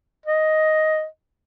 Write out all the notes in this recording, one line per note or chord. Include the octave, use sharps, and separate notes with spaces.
D#5